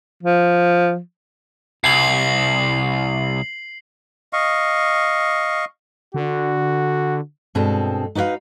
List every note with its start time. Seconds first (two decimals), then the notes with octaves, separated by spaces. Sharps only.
0.23 F3
1.84 C2 C7 F#7
4.33 D#5 F5 C#6
6.14 D3 F#4
7.55 G2 B2 G#3 C4 A4
8.15 D#4 F#4 B4 D5 F5